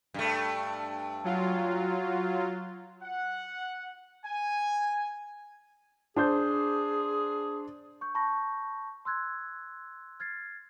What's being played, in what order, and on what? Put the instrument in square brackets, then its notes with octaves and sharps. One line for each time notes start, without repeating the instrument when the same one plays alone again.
[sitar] G2 A3
[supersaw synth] F#3 F4
[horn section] F#5
G#5
[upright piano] D4 C5 G6 [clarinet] G#4
[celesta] C#6 G6
A5 B5 C#6 G6 A#6
C6 E6 F#6 G#6
F6 G#6 A6 C7